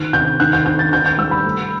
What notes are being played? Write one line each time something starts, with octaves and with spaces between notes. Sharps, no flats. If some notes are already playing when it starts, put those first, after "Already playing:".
Already playing: D#3 F#6
C3 G6
D#3 F#6
G6
D#3 G6
A6
D#3 G6
G6
G3 E6
B5
A3